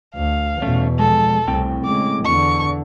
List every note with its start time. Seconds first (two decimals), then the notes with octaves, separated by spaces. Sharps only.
0.15 D2 F5
0.62 E2 B2 A3 C#4
0.99 F3 G#3 A4
1.48 C2 A2 C4 G5
1.85 C#3 G#3 D6
2.25 E2 D3 C#6